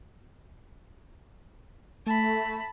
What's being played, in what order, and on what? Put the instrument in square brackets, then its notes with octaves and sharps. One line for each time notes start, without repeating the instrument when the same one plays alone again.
[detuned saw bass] A3 [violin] A5 B5